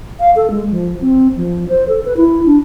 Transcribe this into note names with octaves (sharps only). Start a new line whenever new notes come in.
F5
A4
G#3
F3
C4
F3
C5
A4
B4
E4
D4